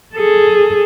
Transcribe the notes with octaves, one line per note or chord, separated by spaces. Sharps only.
G#4 A4